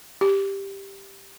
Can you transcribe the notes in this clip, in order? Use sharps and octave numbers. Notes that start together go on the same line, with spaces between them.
G4